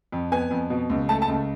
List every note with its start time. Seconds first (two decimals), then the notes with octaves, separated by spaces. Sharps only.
0.12 F2
0.32 B3 G#5
0.51 F2
0.70 B2
0.90 C#2
1.09 A3 A5
1.22 A5
1.28 C#2